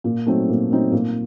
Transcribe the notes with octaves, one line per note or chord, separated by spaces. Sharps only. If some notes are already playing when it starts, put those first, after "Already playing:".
A#2
F#3 A3 C4 D#4
A#2
F#3 A3 C4 D#4
A#2